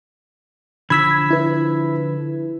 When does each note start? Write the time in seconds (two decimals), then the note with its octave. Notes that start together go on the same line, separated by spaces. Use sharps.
0.90 D3 F3 B5 E6 G#6 B6
1.31 E4 B4